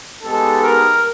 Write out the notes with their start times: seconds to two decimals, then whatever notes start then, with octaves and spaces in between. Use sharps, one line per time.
0.22 G#3 B3 D#4 G4 A4
0.62 A#4